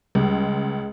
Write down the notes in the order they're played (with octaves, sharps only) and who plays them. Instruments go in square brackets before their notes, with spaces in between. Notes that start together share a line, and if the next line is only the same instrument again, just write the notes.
[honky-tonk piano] C#2 [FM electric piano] G3 [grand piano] G#3